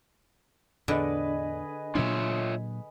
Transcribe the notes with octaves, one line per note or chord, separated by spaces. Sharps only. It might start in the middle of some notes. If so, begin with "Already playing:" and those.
E2 A2 D3 G#4 B4 D#5
A#2 F#3 D4 F4 C#5 E5